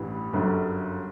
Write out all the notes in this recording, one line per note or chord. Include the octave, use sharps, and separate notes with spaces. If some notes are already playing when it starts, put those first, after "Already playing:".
Already playing: A1 G2 E3 G3
G1 F#2 D3 G3